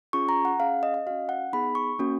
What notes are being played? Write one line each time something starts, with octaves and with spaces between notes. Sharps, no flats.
C#4 F4 G#4 C#6
A#5
F#5
C#4 G#4 F5
D#5
D#5
C#4 F#4 F5
F#5
B3 D#4 G#4 B5
C#6
A#3 C#4 F#4